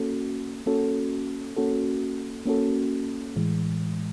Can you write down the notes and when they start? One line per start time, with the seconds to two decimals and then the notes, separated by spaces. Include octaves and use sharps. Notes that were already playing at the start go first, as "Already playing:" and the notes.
Already playing: A#3 C#4 F#4 A4
0.66 A#3 C#4 F#4 A4
1.56 A#3 C#4 F#4 A4
2.46 A#3 C#4 F#4 A4
3.36 A2 E3 G#3